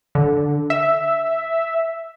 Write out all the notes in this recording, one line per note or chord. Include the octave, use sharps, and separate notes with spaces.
D3
E5